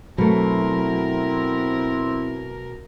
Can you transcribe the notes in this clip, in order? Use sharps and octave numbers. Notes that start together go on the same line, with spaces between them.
B2 F#3 A3 C4 E4 A#4